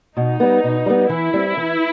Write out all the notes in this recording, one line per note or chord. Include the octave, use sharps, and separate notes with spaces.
B2 D#4
G3 B3
B2
G3 B3
E3 E4
G3 C4
E3